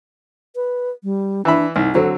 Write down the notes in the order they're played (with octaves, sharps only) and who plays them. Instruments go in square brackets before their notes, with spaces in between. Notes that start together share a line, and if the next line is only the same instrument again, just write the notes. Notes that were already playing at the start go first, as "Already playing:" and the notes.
[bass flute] B4
G3
[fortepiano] E3 E5 B5 [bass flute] D4
[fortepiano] C2 [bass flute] D#4
[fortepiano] D3 F#3 C4 [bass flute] A4